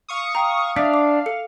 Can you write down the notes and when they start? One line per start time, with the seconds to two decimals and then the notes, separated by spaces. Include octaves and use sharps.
0.09 F5 C#6 D#6
0.35 G5 A#5
0.76 D4 E5 F5 D#6 B6
0.94 D6
1.26 A4 C#7